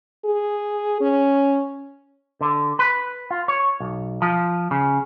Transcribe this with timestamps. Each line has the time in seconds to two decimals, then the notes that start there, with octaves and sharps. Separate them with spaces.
0.25 G#4
1.01 C#4
2.41 D3
2.79 B4
3.31 F4
3.48 C#5
3.80 B1
4.22 F3
4.71 C#3